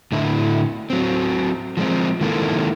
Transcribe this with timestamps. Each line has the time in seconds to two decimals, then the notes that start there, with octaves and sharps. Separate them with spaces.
0.12 A2 D3 E4
0.90 F#3 C4
1.77 F3 G#3 C4
2.21 D#3 G#3 A#3 E4 A4